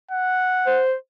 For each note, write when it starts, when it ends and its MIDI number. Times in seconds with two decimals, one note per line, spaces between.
0.12 0.83 78
0.67 0.94 72